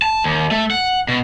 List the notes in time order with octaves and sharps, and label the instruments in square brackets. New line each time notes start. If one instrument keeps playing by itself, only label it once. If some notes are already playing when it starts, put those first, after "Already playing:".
[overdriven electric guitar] A5
D#2
A3
F#5
B2